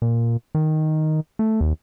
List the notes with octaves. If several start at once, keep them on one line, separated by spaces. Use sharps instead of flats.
A#2
D#3
A3
D#2